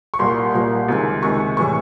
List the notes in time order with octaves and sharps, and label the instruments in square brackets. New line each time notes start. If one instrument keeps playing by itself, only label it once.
[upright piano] C#6
C2 A#2 G3 A#3 C6
C2 A#2 G3 A#3
C#2 C3 D#3 G#3
C#2 C3 D#3 G#3 C#6
A2 E3 G3 C#6